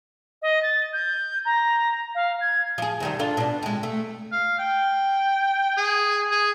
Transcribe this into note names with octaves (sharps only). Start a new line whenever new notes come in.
D#5
A6
G6
A#5
F5
G#6
F3 G#4
C3 D#3 G3
D4 F4 A4
B2 D4
C3 G#3
A3
F5
G5
G#4
G#4